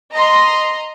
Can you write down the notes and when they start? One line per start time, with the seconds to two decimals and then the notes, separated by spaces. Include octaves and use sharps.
0.13 D#5 A#5 C6